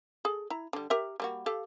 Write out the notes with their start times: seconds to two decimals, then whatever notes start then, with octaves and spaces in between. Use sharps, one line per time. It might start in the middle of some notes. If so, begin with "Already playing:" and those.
0.25 G#4 A4
0.50 E4 A#5
0.73 D3 G3
0.90 G4 A#4 E5
1.20 G3 A#3 F#4
1.46 G4 A4 F5